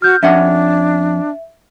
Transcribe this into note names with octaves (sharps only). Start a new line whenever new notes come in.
F#4 F6 G6
F2 C#4 D4 E5 F#5